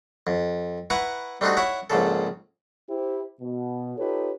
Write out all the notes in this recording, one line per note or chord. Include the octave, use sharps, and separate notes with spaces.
F2
E4 B4 F#5 A#5 C#6
G3 A3 C4 D4 D#4 F#4
E4 C#5 E5 F#5
A#1 G#2 C#3 A4
E4 G4 C5
B2
D#4 F4 G4 A4 B4 C#5